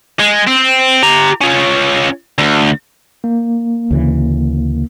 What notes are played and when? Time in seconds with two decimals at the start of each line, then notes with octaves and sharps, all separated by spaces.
0.19 G#3
0.47 C4
1.03 G4 A#5
1.41 C#4 F4
2.38 D2
3.24 A#3
3.91 D2 C#3 E3